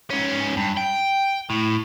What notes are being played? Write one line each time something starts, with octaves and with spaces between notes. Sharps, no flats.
G#2 C#4
G2
G5
A2